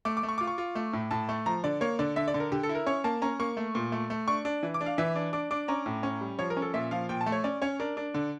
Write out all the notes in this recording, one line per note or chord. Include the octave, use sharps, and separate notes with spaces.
A3 D6
D6
A3
C#6
F4 D6
C#6
F4
A3
A2
A2 A5
A3
F3 A#5
D3 D5
A#3 C#5
D3 D5
D3 E5
D5
D3
A#4
D3 G4
A4
E4
A#4
C#4 C#5
A#3 A5
C#4 A#5
A#3 C#6
A3
A#2
A3
A3
D4 C#6
D4
E3
D6
D4
F5
E3 E5
D4
D4 D6
D4 D6
C#4 A#5
A2
C#4
G3
F3 C#5
A#4
C#4
A4
A#2 E5
F3 F5
A#2 G5
A5
A3
C#5
C#4 D5
C#4 C#5
D4 A#4
D4
D3